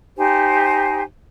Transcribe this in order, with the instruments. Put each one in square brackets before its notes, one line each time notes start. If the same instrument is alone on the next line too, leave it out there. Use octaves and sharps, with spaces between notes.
[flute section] D#4 G4 C5 G#5